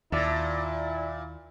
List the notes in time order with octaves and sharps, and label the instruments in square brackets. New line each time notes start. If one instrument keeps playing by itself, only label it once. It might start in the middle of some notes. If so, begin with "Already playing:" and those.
[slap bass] D#2 [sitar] A#2 [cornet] E4 [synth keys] D5 E5 A5